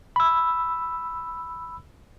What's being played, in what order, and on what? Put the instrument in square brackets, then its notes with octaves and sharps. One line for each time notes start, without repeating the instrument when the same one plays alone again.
[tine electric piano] B5 E6